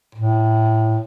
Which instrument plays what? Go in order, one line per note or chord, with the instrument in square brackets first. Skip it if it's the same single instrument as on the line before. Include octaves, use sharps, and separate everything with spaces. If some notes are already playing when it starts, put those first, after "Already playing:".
[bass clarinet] A2